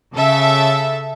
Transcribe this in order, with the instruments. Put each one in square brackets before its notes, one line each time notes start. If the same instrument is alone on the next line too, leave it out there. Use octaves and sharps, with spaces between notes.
[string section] C#3 A4 E5